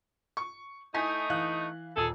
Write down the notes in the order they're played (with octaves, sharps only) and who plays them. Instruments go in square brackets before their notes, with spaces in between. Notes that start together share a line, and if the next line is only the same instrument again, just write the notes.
[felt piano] C#6
[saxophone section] A3 D#4 [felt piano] E4 G#5 B6
[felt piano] E3 F5 F#6
[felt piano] D#1 [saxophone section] G#4 A4